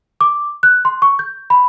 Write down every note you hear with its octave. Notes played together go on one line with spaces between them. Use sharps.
D6
F#6
C6
C#6
G6
B5